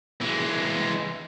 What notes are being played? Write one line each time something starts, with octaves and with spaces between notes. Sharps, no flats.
E3 G#3